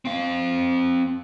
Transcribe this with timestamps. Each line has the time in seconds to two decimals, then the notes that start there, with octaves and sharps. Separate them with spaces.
0.05 C4 F5